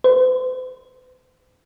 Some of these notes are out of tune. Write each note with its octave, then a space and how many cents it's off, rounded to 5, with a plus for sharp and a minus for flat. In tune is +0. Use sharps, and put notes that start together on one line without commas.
C5 -45